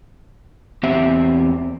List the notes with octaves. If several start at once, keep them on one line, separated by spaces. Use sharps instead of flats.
E2 C4 G4 E5